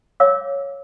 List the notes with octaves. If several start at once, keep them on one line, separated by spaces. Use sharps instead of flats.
C#5 F5 D6 E6